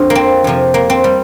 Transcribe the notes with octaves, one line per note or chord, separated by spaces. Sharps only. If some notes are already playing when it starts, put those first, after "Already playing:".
Already playing: F2 F3 D4 F4
A#3
C4
F2 C3 F3
A#3
C4
G3